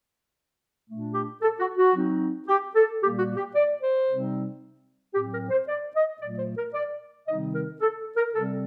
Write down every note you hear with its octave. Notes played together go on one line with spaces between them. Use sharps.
A#2 A3 D4
G4
A4
F#4
F#4
F#3 C4 D#4
G4
A4
A#2 G3 A#3 G4
F#4
G4
D5
C5
C3 G3 C4 D#4
A2 F#3 C4 G4
A#4
C5
D5
D#5
A#2 F#3 A3 D5
C5
A#4
D5
C3 D#3 G3 C4 D#4 D#5
A#4
A4
A#4
C3 G3 C4 A4